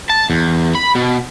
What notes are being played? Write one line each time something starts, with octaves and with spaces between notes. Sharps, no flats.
A5
E2
B5
B2